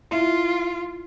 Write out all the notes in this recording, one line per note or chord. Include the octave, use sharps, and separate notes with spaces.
E4 F4 E5